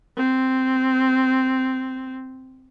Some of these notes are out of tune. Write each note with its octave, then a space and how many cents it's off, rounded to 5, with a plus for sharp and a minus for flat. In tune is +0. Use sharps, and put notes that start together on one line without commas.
C4 -5